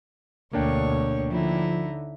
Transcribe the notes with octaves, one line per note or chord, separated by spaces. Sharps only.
D2 B2 A#3 D4 C#5 G5 C#6
D3 F3 D#4 E4